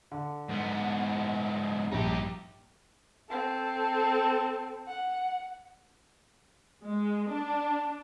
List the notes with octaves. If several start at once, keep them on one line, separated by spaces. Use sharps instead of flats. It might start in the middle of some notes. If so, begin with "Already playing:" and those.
D3
G#2 B3
A#1 G2 D#4 G4
C4 A4
F#5
G#3
D4